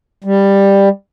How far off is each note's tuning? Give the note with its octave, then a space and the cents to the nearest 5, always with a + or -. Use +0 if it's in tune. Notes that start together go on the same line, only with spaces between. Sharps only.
G3 +10